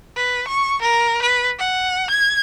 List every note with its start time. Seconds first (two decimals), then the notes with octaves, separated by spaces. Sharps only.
0.16 B4
0.48 C#6
0.82 A#4
1.22 B4
1.59 F#5
2.10 G#6